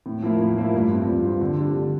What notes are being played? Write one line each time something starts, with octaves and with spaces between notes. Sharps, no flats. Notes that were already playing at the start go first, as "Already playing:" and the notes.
A2
F3 A#3 E4
A2
F3 A#3 E4
G2
F3 C4 F4
G2
F3 C4 F4
D3
G3 D4
D3